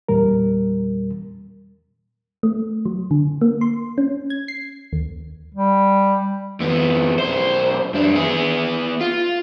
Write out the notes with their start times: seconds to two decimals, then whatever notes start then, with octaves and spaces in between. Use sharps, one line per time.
0.09 E2 A#2 G3 A#4
2.43 A3
2.86 F#3
3.11 D3
3.41 A#3
3.61 C6
3.98 C#4
4.30 G#6
4.48 C7
4.93 D#2
5.54 G3
6.60 F2 B3
7.19 B1 C5
7.94 F#2 D4
8.15 B3 G#4
9.01 F4